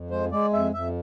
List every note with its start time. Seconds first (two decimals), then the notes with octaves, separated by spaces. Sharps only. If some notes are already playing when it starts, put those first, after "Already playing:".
Already playing: F2
0.10 G#3 C5
0.31 G#3 D5
0.53 F2 E5
0.73 F2 E5